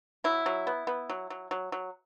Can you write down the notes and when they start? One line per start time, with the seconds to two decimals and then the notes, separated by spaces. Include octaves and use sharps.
0.24 F#3 E4
0.46 F#3
0.67 B3
0.87 B3
1.10 F#3
1.30 F#3
1.51 F#3
1.72 F#3